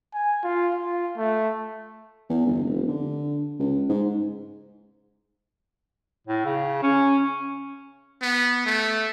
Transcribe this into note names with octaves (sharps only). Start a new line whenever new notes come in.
G#5
F4
F4
A3
E2
G1
F1
D3
C#2
G#2
A2
C#3
C#4
B3
A3